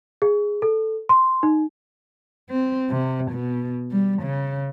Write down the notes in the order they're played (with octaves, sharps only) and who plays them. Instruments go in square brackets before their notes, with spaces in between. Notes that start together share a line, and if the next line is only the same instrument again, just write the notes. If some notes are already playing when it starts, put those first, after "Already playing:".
[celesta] G#4
A4
C6
D#4
[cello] C4
C3
B2
G3
C#3